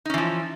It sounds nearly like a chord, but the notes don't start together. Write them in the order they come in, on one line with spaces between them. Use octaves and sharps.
D#4 C#4 E3 F3